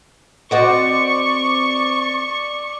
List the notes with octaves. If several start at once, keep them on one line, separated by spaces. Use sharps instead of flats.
C4 F#4 D5 D#5 C#6